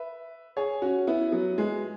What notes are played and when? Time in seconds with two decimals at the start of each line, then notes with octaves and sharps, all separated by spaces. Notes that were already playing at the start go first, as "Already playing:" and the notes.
Already playing: B4 E5
0.57 G#4 C#5
0.82 C#4 F#4
1.07 B3 E4
1.32 F#3 B3
1.58 G#3